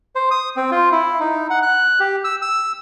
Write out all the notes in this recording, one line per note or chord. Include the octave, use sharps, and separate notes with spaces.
C5
D#6
C4
F4
E4
D#4
F#5
F#6
G4
E6
E6